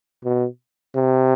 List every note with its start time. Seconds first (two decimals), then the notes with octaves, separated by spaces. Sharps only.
0.25 B2
0.96 C3